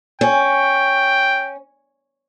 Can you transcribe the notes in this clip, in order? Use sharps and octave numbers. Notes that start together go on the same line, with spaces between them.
C#4 G5